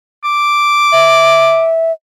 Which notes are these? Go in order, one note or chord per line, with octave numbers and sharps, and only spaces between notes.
D6
E5